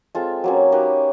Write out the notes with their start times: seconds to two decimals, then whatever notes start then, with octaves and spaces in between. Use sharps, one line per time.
0.15 G#3 C4 F4 A4
0.44 F#3 A#3 C#4
0.72 A#3 D#4 G4 B4